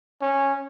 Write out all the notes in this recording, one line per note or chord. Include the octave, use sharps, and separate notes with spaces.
C#4